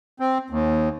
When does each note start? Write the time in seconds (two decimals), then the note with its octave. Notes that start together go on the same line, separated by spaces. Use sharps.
0.20 C4
0.50 D#2